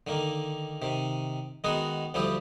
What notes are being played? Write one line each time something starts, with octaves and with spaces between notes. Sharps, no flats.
D3 D#3 A#3
C3 D#3
D#3 G#3 B3 D#4 F#4 G#4
D2 F3 G3 E4 G4 D#6